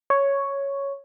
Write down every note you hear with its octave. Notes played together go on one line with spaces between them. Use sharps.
C#5